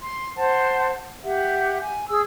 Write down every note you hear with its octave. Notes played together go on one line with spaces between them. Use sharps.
C6
C5 F#5 A5
G4 E5 F#5
G#5
G#4 E6